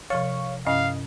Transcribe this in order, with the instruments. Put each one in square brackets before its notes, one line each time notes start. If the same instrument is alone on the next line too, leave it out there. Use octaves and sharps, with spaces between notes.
[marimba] C3 F3 A6 [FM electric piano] C#5 F5 C#6
[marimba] G2 C3 C#4 [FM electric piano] D#5 [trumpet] F5